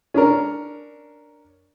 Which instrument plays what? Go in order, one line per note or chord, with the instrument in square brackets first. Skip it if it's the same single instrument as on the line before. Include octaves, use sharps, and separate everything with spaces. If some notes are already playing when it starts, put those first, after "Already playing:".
[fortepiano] C#4 D4 A#4